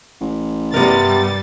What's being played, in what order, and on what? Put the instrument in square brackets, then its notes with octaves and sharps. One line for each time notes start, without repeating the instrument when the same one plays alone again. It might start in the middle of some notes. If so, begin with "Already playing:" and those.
[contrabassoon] A1
[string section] G2 G3 A6 [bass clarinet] C3 [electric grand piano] B3 A#4